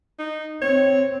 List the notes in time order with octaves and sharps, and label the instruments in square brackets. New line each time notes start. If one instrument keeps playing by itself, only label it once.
[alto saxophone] D#4
[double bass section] C4 [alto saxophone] C#5